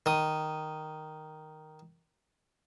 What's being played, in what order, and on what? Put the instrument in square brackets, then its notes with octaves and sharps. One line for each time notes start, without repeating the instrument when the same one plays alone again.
[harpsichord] D#3 D#6